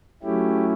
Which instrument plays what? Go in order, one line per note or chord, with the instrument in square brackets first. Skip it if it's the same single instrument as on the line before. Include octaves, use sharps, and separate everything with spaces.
[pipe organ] F#3 A3 C#4 E4 G4